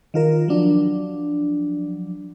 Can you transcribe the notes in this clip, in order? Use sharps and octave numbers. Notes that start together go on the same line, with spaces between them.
D#3 F4 A#4
F3 F#3 D4